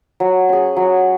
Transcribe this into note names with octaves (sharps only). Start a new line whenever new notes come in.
F#3
C#4 G#4
F#3